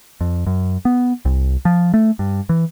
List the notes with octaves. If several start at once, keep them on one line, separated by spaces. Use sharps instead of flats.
F2
F#2
B3
C2
F3
A3
G2
E3